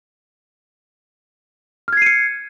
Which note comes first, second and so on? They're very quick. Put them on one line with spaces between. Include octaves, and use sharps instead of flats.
F6 G#6 C7 D#7 C#7